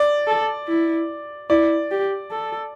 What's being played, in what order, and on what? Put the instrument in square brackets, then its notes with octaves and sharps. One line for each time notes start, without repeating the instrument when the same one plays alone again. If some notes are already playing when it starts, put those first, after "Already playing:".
Already playing: [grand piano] D5
[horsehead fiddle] A4
E4
[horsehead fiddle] E4 [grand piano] D5
[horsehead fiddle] G4
A4